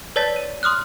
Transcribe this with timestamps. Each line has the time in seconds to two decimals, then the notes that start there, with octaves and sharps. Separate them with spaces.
0.16 B4 C#5 D5 A5 A6 B6
0.36 D#7
0.63 C6 D#6 F6 F#6